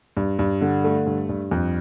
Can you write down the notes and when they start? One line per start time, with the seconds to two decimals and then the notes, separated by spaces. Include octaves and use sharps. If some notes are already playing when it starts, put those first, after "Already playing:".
0.17 G2
0.39 G2
0.61 D3
0.84 A3
1.06 G2
1.29 G2
1.51 F2